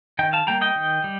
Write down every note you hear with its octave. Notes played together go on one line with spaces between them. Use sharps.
D#3 D#5 G5
F5 A5
G3 A#3 G5 A#5
D#5 G5
D#3
G3